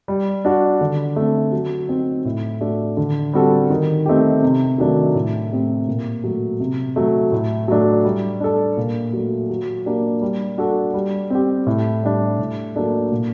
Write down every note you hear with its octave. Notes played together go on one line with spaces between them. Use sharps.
G3
D4 F#4
D3
A3 C4
F#3
C4 D#4
A2
A3 D4 F#4
D3
G3 C4 F#4 A4
D#3
A3 C4 D#4 G4
C3
D#3 F#3 A3 D4
A2
A3 C4 G4
A#2
F#3 A3
C3
F#3 A3
A2
F#3 A3 D4
G3
D4 A4
A#2
F#3 A3
F#3
A#3 D4 G4
G3
D4 F#4 A4
G3
C4 G4
A2
G3 D4
A2
F#3 A#3 D4 A4
A#2